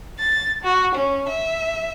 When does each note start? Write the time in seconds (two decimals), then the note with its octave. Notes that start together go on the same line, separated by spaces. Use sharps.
0.19 A6
0.63 F#4
0.94 C#4
1.28 E5